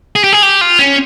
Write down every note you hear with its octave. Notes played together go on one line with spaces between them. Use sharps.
G#4
G4
G#4
G4
F4
C#4